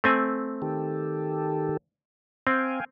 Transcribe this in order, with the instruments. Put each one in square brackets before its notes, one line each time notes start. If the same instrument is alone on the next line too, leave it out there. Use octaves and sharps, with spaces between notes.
[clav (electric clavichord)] A3 C4 G#5
[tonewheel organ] D#3 G4 A4
[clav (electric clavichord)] C4 [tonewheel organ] F5 G5 G#5